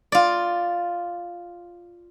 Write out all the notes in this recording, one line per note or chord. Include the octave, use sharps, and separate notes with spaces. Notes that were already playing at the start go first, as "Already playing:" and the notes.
F4 D5